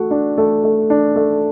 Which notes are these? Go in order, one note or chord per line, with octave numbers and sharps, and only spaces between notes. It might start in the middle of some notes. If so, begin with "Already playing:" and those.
Already playing: A3 F#4
D4
A3
A3
D4
A3